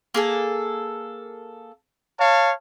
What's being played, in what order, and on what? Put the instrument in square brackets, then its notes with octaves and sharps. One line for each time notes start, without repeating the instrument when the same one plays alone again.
[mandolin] A#3 G#4 A4
[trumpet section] C#5 F5 A5